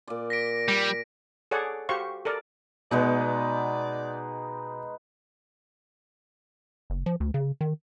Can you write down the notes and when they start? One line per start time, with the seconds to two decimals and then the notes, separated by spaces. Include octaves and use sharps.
0.08 A#2 D5
0.30 A#6 B6 D7
0.68 G3
1.51 G#4 A4 C#5 D5 F#5
1.89 F#4 G4 C5 F5 C#6
2.25 A4 A#4 D5
2.91 B2 G#3 B3 D#4 D5
6.90 F#1
7.06 F3
7.20 D2
7.34 C#3
7.61 D#3